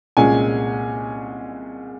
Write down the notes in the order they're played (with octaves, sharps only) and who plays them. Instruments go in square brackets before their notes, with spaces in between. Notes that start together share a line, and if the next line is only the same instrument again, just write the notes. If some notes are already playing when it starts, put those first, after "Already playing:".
[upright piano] C2 A#2 G#3 C#4 G#5